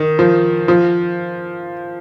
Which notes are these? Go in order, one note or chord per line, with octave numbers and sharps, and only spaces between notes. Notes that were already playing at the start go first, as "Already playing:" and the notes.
Already playing: D#3
F3
F3